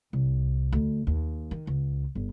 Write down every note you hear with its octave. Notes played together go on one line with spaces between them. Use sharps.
C2
D2
D#2
D#3
C#2
G1